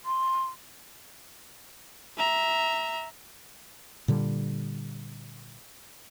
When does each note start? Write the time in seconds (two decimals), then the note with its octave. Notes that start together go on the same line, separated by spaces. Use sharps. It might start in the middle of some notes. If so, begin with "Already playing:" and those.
0.05 C6
2.17 E5 A#5
4.08 A#2 D3 G3